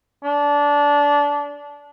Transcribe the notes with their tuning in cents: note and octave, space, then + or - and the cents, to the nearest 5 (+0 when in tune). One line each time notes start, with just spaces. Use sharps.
D4 -20